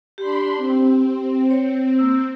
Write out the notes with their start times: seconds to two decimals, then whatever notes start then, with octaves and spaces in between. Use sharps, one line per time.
0.18 D4 G4 B5 C6
0.57 C4
1.51 C#5
1.98 A#3 E6